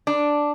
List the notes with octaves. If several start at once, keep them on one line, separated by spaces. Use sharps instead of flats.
D4